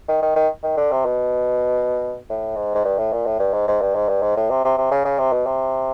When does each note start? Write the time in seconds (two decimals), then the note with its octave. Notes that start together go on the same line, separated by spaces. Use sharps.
0.08 D#3
0.22 D#3
0.36 D#3
0.63 D#3
0.77 D3
0.91 C3
1.05 B2
2.29 A2
2.56 G#2
2.75 G#2
2.85 G2
2.98 A2
3.12 A#2
3.26 A2
3.39 G2
3.53 G#2
3.68 G#2
3.81 G2
3.95 G#2
4.09 G2
4.22 G#2
4.36 A2
4.50 C3
4.64 C3
4.77 C3
4.91 C#3
5.05 C#3
5.19 C3
5.32 B2
5.46 C3